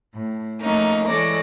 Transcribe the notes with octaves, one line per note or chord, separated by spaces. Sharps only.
A2
F3 A3 A#3 C#4 D#4
E3 G#3 A4 C#5 D5 A#6